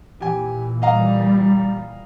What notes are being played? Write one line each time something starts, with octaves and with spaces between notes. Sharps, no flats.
A#2 E3 G4 G#5
G3 D#5 F5 A#5